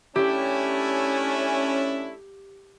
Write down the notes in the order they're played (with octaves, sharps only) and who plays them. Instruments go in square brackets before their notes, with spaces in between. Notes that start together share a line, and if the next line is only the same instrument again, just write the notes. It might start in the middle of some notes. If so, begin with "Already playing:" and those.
[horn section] A3 D4 E4 [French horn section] C#4 [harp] G4